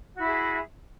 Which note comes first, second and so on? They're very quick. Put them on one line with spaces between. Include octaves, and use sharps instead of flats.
F#4 E4 E5 G#4